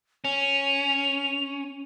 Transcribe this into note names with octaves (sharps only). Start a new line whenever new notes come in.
C#4 F7